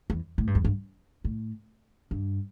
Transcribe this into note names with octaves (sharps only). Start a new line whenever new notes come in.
E2
A2
G2
E2
G2
A2
G2